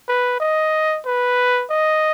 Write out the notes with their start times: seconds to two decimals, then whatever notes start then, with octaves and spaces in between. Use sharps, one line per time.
0.08 B4
0.40 D#5
1.06 B4
1.71 D#5